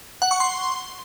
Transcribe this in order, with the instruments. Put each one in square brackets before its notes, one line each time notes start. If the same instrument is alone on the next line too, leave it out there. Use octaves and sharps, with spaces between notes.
[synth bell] F#5
C#6
C6